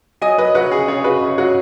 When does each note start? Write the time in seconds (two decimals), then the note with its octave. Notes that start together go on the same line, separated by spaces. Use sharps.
0.21 F#3 D#5 G#5
0.38 F#3 B4 D#5
0.55 F#3 F#4 B4
0.72 C#3 G#4
0.88 C#3 G#4 C#5
1.04 C#3 F#4 B4
1.21 C#3
1.38 F#3 F#4